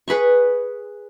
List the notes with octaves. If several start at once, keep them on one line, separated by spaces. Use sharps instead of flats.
G#4 B4 B5 C#6